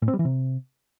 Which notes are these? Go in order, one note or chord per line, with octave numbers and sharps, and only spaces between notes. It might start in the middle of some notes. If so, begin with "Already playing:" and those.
A2
C4
G3
E3
C3